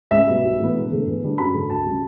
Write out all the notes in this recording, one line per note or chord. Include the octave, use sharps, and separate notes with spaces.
C#2 E5
B2 G3
B1
A2 E3 B3
E1
E2 D3 A3
E2
D3 G3 D4
F#2 B5
D3 F#3 A3
D2 A5
C#3 G3